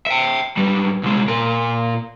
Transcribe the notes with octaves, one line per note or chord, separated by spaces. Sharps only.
E5 G5
G#2 G3
C2 G#3
A#2 A#4